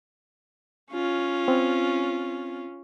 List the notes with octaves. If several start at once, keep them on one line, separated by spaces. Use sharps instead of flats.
C#4 F4
C4